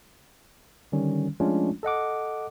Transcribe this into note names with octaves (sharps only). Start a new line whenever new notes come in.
D3 D#3 G3 C#4
F3 G#3 A3 C#4 D4 F4
A4 D#5 F#5 D6